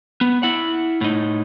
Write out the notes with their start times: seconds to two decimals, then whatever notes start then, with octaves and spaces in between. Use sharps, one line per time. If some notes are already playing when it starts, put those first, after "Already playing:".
0.21 B3
0.43 E4 F#5
1.01 A2 D#4